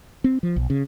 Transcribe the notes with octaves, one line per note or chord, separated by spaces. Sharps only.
C4
F3
B1
C#3